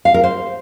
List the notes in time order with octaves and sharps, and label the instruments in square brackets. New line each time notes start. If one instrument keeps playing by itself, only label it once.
[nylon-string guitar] F5
A#4
C5